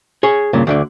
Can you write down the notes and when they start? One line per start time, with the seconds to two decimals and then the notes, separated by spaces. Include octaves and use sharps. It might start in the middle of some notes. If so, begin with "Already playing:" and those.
0.23 G#4 C#5
0.53 G2 A#2 C#3
0.67 D2 D3 D5